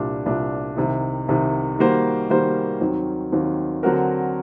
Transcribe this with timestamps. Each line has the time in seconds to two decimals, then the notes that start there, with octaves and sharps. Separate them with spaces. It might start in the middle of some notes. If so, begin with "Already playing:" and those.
Already playing: C2 A#2 G3 D4
0.26 C2 A#2 G3 D4
0.77 C2 C3 D#3
1.28 C2 C3 D#3
1.79 D#3 G3 A#3 F#4 C5
2.30 D#3 G3 A#3 F#4 C5
2.80 D#2 D#3 F#3 C4
3.32 D#2 D#3 F#3 C4
3.83 D3 F#3 C4 F#4 A#4